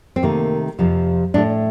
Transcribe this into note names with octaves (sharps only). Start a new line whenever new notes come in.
C4
C3 D#3 A3 A#3
F2 C3 F3
A2 A3 D4